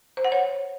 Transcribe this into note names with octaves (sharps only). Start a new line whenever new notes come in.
C5
F#5
C#5